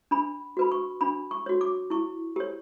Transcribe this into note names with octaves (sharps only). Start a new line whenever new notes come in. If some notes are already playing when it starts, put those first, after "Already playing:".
D4 B5
F#4 B4 B5
C#6
D4 B5
C#6
F#4 C#5
D6
E4 C#6
G4 C#5